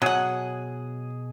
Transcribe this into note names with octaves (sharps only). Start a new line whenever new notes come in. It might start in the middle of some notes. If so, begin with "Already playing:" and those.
B2 F#3 G#4 F#5 G#5